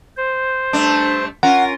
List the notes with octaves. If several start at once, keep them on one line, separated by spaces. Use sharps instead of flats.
C5
G2 A3 D4
C#4 F4 A#4 F#5